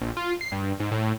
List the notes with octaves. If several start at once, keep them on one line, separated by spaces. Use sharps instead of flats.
A#1
F4
C7
G2
G#2
A2